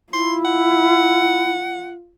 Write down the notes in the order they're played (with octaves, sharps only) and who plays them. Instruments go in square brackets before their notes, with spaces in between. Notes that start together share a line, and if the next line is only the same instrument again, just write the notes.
[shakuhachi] E4 [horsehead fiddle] F4 [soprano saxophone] C6
[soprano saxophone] F#5